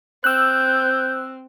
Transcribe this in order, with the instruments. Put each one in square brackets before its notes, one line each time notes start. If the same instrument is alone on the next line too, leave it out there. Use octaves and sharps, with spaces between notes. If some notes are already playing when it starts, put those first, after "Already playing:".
[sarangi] C4 [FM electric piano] E6 F#6 [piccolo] G6